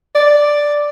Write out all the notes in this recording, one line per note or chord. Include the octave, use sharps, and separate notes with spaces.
D5